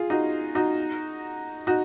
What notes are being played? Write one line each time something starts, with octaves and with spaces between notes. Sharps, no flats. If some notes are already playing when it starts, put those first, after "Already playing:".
Already playing: F4 G#4
D#4 F#4
D#4 F#4
D#4 F#4